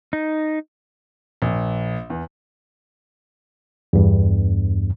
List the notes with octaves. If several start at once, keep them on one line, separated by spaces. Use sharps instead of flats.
D#4
A#1
E2
E2 G2